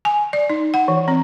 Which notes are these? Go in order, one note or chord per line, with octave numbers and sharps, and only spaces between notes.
G#5
D5
D#4
F#5
E3
C4